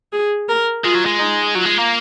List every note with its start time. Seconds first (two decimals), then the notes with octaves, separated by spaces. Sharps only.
0.13 G#4
0.49 A#4
0.84 G#3 F4
0.94 F#3
1.05 G#3
1.19 D#4
1.55 F#3 F4
1.66 G#3
1.78 A#3